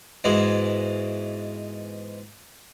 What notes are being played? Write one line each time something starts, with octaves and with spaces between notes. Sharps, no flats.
G#2 B2 E3 G#3